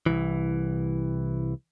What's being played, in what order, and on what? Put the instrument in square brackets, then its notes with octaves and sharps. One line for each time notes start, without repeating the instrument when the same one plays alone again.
[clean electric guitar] C2 E3